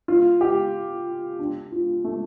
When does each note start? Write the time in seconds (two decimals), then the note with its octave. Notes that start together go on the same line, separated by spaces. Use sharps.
0.08 F4
0.41 G4
1.39 D4
1.72 F4
2.04 A3